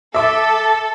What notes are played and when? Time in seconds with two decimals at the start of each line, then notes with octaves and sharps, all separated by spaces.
0.15 A4 E5 D6